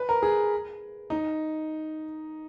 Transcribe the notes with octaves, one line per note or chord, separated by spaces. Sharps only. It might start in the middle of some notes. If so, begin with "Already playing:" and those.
Already playing: B4
A#4
G#4
D#4